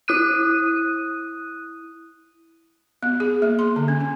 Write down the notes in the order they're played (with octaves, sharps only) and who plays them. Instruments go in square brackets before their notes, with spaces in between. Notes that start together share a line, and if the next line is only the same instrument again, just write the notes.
[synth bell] E4 D#6 F#6 D#7
[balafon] B3
G#4
A#3
C6
D3
C#4
C#4